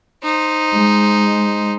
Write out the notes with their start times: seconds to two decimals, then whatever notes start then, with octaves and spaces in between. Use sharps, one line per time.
0.23 D#4 C5
0.74 G#3